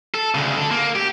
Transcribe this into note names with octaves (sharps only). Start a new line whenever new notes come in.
A4
D2 C#3
D4 A4
A#3
G4